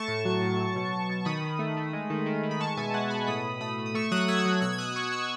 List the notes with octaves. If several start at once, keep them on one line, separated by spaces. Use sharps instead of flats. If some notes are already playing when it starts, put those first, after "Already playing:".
Already playing: A3 A5 C#6
A2
F#3
A2
F#3
B2
B2
B2
D#3 B5 D#6
D#3
A3
A3
G#3
D#3
D#3
D#3
B5
G#3 A5 C#6
B2 E5 G#5
G#3 F#5 A5
B2 G#5 B5
A2 B5 D#6
A2
A3 B5 D#6
A3
D#6
A3 C#6 E6
F#3 D#6 F#6
A3 E6 G#6
F#3
B2 E6 G#6
G#6
B2 D#6 F#6
B2 C#6 E6
B2 C#6 E6